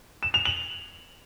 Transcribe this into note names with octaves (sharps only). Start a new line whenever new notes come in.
E7
F7
F#7